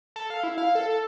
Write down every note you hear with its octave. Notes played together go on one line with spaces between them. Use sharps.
A4
F5
E4
F5
A4
A4